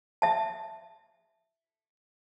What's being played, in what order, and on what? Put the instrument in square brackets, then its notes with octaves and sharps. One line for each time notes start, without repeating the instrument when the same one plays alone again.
[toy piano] E5 A5